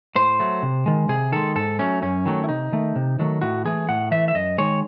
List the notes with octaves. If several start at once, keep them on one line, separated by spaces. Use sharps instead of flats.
A2 C5
F#3 A3
C3
D#3 G#3
C3 G#4
D#3 G#3 A4
G#2 A4
F#3 A3 C#4
F#2 C#4
D#3 F#3 A3
E4
C3 D#4
D#3 A3
C3
D#3 F#3 A3
A2 F#4
E3 A3 G#4
A2 F#5
E3 A3 E5
E5
F#2 D#5
D#3 G#3 C#5